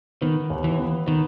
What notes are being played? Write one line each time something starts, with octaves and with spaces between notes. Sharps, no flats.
D#3 B3
D#2
E3
B3
D#3 B3